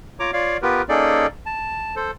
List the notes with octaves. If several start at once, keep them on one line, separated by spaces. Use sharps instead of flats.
F4 C#5 A#5 D6
F4 C#5 D5 F5
B3 F4 G4 A#4 B4
A#3 C#4 D#4 G#4 A4 D5
A5
A4 C5